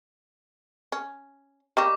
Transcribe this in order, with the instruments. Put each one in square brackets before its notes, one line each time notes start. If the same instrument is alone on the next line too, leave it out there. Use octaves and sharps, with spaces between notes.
[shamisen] C#4
[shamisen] G3 A#3 D#4 [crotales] C#6 D6